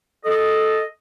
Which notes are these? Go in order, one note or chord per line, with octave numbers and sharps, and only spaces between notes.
A4 D#5